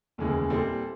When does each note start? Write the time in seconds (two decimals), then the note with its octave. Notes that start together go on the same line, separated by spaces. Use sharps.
0.18 F1 D#2 C#3 E3 G#3
0.50 A#2 G3 C4 E4 A4